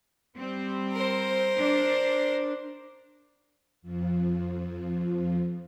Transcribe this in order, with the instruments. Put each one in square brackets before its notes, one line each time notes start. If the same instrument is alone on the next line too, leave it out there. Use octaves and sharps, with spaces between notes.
[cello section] G3 C4
[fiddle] A#4 C5
[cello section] D4
[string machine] F2 F3